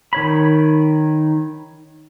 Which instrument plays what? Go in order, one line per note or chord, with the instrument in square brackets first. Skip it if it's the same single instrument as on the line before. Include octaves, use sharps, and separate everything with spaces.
[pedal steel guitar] D#3 C#5 B5